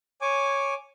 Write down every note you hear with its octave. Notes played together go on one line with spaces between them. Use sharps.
C#5 G#5 D6